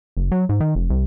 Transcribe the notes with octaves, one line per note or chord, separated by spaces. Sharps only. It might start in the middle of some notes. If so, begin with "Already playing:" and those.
F#1
F#3
G#2
D#3
F1
C2